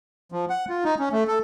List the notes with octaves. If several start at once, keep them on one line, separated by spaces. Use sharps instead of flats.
F3
F#5
F4
D#4
C#4
A3
A4